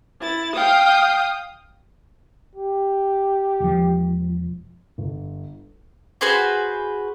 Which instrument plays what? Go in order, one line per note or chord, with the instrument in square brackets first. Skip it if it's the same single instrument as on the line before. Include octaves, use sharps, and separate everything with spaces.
[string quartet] E4 A6
F5 G5 D#6
[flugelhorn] G4
[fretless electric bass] E1 F3
[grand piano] G1
[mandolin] F#4 G#4 B4 C5